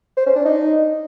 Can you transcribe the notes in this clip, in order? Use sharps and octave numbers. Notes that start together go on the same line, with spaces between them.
C5
C#4
D4
D#4